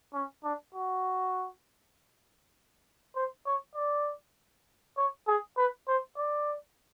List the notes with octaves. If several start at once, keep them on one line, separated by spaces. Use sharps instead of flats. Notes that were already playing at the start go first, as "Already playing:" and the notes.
C#4
D4
F#4
C5
C#5
D5
C#5
G#4
B4
C5
D5